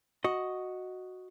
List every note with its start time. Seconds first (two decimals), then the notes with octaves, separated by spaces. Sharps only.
0.24 F#4 D#5